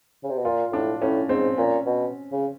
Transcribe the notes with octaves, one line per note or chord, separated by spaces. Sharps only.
C#3
C3
B2
A#2 F4
A2 D4
A2 C#4
G#2 C4
A#2 C#4
B2
C#3